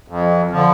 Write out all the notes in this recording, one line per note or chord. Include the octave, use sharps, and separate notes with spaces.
F2
D3 F3